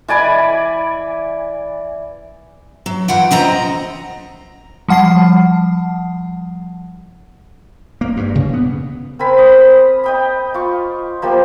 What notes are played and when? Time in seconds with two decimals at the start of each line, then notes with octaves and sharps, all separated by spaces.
0.08 E3 D5 G#5 B5
2.86 F#3
3.08 E3 F4 F#5 G5
3.31 F3 C4 D#5 A#5
4.88 F3 G3 F#5 A5 C7
8.01 A#3
8.17 G2
8.35 C#3
8.53 B3
9.19 C4 A#4 G#5 B5
9.39 D#6
10.04 D#5 G5 B5
10.54 F4 C#6
11.22 F3 A#3 G4